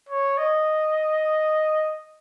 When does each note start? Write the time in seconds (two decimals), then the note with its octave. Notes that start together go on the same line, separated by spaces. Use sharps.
0.09 C#5
0.38 D#5